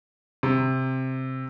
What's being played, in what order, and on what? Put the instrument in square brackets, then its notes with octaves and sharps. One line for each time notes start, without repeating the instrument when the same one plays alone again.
[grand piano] C3